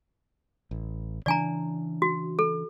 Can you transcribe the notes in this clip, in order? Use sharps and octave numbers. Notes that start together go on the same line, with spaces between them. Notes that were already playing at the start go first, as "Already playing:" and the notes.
A1
C#3 E3 D4 D5 G#5 A#5
F#4
A4